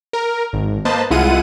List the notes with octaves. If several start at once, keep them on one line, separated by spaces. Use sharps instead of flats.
A#4
G#1
A#3 B4 C5 D#5 A5
C2 G#3 E4 F4 F#5 D#7